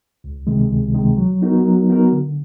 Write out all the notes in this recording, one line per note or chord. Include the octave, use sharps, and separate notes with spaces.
C#2
C3 D#3 G#3
C#2
C3 D#3 G#3
F#3
B3 D#4 F#4 A#4
F#3
B3 D#4 F#4 A#4
D3